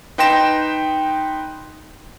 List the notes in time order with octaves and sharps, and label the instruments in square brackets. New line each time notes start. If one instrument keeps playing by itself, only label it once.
[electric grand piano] D#4 B4 G5 C6 A#6 E7